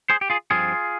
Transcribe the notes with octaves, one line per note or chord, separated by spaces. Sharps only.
G#4 C5
G4
F4 G#4
G2 F3 C4 F4 G#4